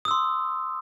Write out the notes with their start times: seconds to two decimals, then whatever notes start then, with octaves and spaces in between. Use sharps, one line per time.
0.05 D#6
0.08 E6
0.11 C6